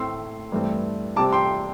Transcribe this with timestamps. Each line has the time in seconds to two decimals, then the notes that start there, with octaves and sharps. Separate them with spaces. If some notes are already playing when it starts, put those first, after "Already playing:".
Already playing: A2 A3 C4 C6 E6
0.52 G2 E3 A3 C4
1.16 C3 G3 C4 A5 D6
1.33 G5 C6